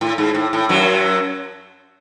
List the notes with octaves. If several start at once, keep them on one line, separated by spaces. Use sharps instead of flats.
A2
G#2
A2
A2
F#2 F#3